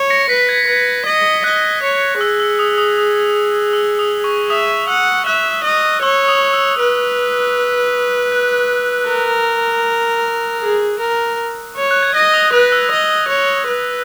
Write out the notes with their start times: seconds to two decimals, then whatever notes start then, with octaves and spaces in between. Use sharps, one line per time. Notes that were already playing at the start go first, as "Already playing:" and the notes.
Already playing: C#5
0.10 A#6 C#7
0.29 B4 B6
0.49 G#6
0.67 B4 G#6
1.06 D#5
1.44 D#5 F#6
1.83 C#5
2.20 G#4 E6
2.40 E6
2.59 D#6
2.78 D#6
2.98 D#6
3.73 E6
3.99 D#6
4.24 C#6
4.50 E5 D#6
4.88 F#5 E6
5.26 E5 F#6
5.64 D#5
6.02 C#5 E6
6.28 D#6
6.53 E6
6.80 B4
8.32 F#6
9.09 A#4
10.62 G#4
11.00 A#4
11.76 C#5
11.91 F#6
12.02 G#6
12.14 D#5 A#6
12.34 D#6
12.53 B4 D#6
12.72 E6
12.91 D#5
13.28 C#5
13.68 B4